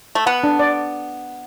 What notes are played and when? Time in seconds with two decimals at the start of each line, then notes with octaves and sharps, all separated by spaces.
0.15 A3
0.26 B3 F#5
0.44 D4
0.59 D5